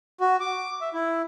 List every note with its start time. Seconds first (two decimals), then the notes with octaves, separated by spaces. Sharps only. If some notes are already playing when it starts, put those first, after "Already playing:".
0.21 F#4
0.40 D6
0.81 E5
0.94 E4